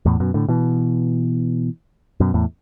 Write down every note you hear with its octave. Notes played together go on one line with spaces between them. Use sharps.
E2 A2
F#2 B2
A2 D3
B2 E3
F#2 B2
E2 A2